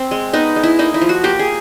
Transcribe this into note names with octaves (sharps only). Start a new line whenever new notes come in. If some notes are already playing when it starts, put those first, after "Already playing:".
Already playing: C4
G#3
B3 D#4
G#3
E4
A#3 D#4
E4
F3
F#4
A#3 G4
G#4